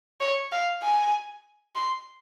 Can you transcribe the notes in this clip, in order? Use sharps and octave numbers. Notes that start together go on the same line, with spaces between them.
C#5
F5
G#5
C6